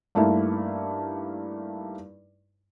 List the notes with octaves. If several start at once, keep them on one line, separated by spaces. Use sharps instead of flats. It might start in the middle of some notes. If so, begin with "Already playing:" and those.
G2 A3 A#3 D#4 E4